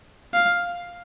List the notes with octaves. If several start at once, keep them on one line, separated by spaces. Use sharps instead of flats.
F5